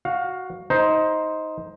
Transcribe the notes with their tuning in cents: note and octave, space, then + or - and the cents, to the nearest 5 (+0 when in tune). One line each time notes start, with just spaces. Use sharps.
F#4 +0 F5 +20
D#4 +15 C5 +0